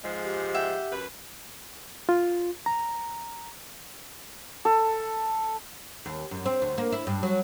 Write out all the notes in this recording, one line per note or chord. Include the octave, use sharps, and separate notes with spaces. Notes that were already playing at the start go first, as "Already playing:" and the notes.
G#2 F3 G#3
G4
E5 F#5 G5
F#2 B4
F4
A#5
A4
D#2
F#2
C4
D2
A#3
E4
G2
F#3